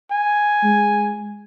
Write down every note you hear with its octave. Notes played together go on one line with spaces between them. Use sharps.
G#5
G#3